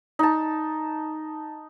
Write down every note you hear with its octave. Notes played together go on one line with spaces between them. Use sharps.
D#4 A5